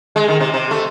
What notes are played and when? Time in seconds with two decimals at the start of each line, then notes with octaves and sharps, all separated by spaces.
0.16 G#3
0.28 D#3
0.40 C3
0.54 C3
0.71 A3